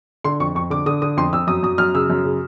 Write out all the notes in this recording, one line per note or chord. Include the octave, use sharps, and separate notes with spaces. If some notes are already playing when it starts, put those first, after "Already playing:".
D3 C6
F2 C#6
F2 C#6
D3 D6
D3 D#6
D3 D#6
F2 C6
F2 E6
F#2 D#6
F#2 D#6
F#2 F6
C#3 E6
F#2
C#3